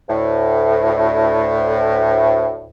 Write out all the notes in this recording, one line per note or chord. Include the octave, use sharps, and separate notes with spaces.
D2 A2